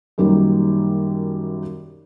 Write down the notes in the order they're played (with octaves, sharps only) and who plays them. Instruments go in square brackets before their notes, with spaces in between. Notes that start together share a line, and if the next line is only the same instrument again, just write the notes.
[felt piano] F#2 D#3 G3 A#3